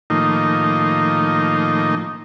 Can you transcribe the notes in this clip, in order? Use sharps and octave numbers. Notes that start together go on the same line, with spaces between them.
A2 D#3 F3 A#3 D#4